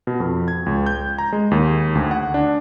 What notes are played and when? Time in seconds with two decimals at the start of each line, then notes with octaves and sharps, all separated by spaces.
0.07 B2
0.20 F2
0.48 G#6
0.66 C#2
0.86 G6
1.18 A#5
1.33 G#3
1.51 D#2
1.95 D2
2.11 F#5
2.34 D4